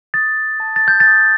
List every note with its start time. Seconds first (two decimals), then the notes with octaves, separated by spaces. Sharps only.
0.14 D#6 A6
0.60 A5
0.76 A6
0.88 G6
1.00 A6
1.07 D#6